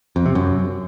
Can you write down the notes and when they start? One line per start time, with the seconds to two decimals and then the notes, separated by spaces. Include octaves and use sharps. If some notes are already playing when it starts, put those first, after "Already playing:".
0.16 F2
0.26 C3
0.35 F#2